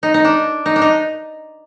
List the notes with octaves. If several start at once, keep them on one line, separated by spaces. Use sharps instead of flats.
D#4
D#4
D4
D#4
D4
D#4